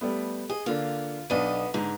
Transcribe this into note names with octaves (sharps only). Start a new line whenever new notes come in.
G3 A3 B3
G#4 D#5
D3 A#3 F4
B1 B3 D4 D#5 D#7
G#2 D3 A#5